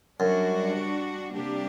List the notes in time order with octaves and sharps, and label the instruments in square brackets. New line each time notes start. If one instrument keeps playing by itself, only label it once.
[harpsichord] F#2 [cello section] G3 D4 F#4
[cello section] C3 G3 A#3 D4 G4